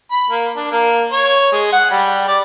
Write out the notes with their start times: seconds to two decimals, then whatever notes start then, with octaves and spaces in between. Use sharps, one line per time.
0.12 B5
0.30 A#3
0.56 D4
0.72 A#3
1.12 C#5
1.52 G#3
1.72 F#5
1.91 G3
2.28 D5